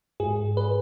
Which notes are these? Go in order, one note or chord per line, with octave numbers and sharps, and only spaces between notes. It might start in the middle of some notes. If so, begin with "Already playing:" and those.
G#2 G#4
B4